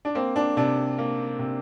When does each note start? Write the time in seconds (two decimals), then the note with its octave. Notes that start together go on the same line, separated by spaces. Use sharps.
0.05 D4
0.15 A#3 C4
0.36 D4
0.57 C3 D4
0.98 A#3
1.39 C3